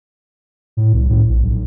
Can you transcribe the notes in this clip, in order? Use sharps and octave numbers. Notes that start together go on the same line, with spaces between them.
A2
C2
A2
A#1
B1